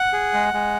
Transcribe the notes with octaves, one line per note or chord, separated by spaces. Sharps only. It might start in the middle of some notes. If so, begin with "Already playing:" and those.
Already playing: F#5
G#4
G#3
G#3